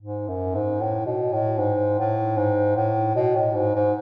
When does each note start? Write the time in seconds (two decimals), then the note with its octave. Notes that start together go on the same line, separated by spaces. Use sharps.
0.02 G#2
0.28 F#2
0.55 G#2
0.81 A2
1.06 B2
1.33 A2
1.59 G#2
1.99 A2
2.37 G#2
2.76 A2
3.16 B2
3.36 A2
3.55 G#2
3.75 G#2